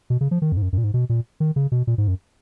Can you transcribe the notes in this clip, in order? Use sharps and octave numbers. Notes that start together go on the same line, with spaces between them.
B2
C#3
F3
D#3
F2
G#2
F#2
F#2
A#2
G#2
B2
A#2
D#3
C#3
B2
A#2
G#2
F#2